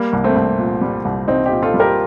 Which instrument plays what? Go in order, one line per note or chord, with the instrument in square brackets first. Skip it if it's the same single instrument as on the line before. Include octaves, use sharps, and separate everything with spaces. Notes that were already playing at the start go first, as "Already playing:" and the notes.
Already playing: [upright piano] G3 A#3
C2
A3 C4
C2
A#2
G3
C2
C2 C4 D#4
D#4 G4
A#2
F4 A4
G3
G4 A#4